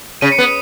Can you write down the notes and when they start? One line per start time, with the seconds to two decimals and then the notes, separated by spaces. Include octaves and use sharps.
0.21 C#3 D#7
0.32 C#7
0.38 B3
0.42 D#6 D#7